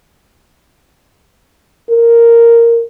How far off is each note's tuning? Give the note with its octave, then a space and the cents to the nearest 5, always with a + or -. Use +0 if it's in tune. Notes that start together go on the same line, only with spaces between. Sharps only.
A#4 -5